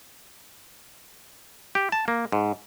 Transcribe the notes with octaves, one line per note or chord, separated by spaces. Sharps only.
G4
A5
A#3
G#2